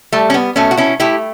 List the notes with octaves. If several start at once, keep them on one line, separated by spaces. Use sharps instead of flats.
G3 A3
C#4
B3
B2 A3 C#4
F#4
C#4 E4
A3 E4 G4